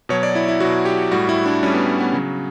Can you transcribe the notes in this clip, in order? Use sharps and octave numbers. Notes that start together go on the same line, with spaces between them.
B2 F#3 C#5
D5
E4
E4
B2 F#3 F#4
G4
A2 G3 F#4
E4
D4
A2 G3 C#4
B3
B3
C#3 F#3